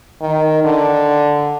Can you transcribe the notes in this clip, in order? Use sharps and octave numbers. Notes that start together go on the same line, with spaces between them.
D#3
D3